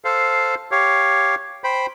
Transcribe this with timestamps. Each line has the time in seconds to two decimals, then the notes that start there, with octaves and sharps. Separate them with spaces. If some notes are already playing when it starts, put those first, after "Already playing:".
0.05 A4 C5 F5
0.71 G4 C#5 F5
1.64 C5 G5 B5